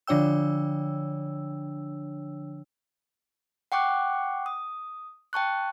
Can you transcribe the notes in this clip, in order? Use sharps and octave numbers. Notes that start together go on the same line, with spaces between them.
D3 F3 D4 C#5 G5 E6
F#5 G5 C#6 D6 F#6
D#6
G5 A5 C#6 F#6